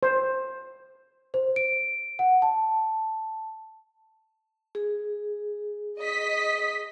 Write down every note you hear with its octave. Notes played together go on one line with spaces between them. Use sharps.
C5
C5
D7
F#5
A5
G#4
D#5 B6